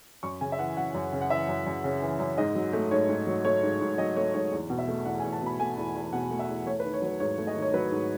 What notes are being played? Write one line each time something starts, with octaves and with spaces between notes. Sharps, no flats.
F#2 C#6
C#3 G#5
E5
E3 F#5
F#2 F#5
F#2
C#3
F#5
E3 E5
F#2
F#2
C#3
E3
F#2
G#2 D#5
F#3
A3
G#2 C#5
G#2
F#3
A3 C#5
G#2
G#2
F#3 D#5
A3 C#5
G#2 C#5
E2
B2
E5
A3
E2 F#5
G#5
E2
A5
B2 B5
A3 G#5
E2
E2
B2 F#5
A3
E5
E2
A3 C#5
B4
D#3
C#5
F#3 B4
G#2 C#5
A3
D#5
D#3
C#5
F#3 B4
G#2